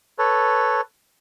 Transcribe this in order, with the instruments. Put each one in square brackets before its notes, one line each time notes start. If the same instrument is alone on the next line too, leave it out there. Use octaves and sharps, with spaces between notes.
[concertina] A4 B4 C#5